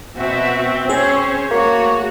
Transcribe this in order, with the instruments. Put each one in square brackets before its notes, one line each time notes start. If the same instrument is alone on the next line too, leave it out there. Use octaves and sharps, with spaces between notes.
[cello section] B2 F#4 E5 [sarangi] C4
[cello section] C#4 C5 C#5 [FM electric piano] G#4
[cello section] A3 F#4 [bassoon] A#3 [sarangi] C#5